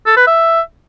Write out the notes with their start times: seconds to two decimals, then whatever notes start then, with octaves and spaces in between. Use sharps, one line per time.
0.06 A4
0.17 B4
0.27 E5